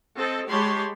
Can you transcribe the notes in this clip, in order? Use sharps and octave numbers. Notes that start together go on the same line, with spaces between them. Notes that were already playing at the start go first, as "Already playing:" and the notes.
C4 A4 D#5
G#3 G4 C#5 A5 B5 C6